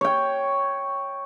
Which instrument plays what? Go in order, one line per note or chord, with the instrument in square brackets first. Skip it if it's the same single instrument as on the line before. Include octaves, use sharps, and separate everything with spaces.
[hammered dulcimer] C#5 G5